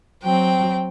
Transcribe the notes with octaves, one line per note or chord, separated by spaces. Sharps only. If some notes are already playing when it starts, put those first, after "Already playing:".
F#3 C4 G5